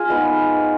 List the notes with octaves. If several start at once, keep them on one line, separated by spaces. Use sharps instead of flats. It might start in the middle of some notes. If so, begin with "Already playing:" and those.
Already playing: F4 G#4 F5 G#5
G#3 B3 D#4